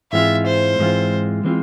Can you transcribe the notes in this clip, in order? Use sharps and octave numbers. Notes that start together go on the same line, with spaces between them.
G#2 E3 G#3 C4 F4 E5
C5
G#2 E3 G#3 C4 F4
E3 G#3 C4 F4